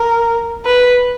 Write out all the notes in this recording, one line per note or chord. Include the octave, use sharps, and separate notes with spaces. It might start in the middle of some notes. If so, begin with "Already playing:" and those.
Already playing: A#4
B4